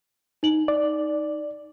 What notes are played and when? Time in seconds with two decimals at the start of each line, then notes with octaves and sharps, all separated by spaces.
0.43 D#4 F#7
0.68 D5